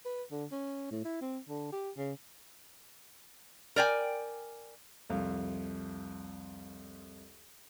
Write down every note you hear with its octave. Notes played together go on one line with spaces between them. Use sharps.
B4
D3
C#4
A2
E4
C4
D3
G4
C#3
A#4 D5 G5 G#5
C2 F2 F5